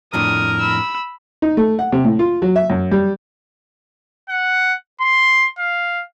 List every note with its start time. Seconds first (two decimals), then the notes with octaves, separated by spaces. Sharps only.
0.13 F2 A2 D4 A#4 D#6
0.59 B5 E6
1.42 D#4
1.57 A3
1.79 F#5
1.92 C3
2.04 A2
2.19 F4
2.42 F#3
2.56 E5
2.70 F#2
2.91 G3
4.29 F#5
5.01 C6
5.58 F5